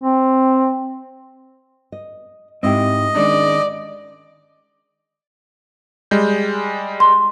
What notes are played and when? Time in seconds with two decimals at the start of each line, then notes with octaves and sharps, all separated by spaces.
0.04 C4
1.92 D#5
2.63 G#2 C4 E4 G4 D#5
3.16 D#3 G#3 C#4 D4 D5
6.11 G3 G#3 G6
7.00 C6